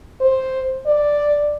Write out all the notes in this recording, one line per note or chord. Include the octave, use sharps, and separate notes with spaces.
C5
D5